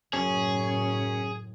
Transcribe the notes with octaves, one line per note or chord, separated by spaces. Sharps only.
F#1 F#2 A2 C#4 G#4